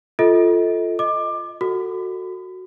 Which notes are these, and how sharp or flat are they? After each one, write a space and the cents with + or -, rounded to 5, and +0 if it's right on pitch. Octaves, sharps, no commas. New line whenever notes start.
F4 +0 A4 +0 D#5 +35
D#5 +0 D6 +20
F#4 +0 A4 +25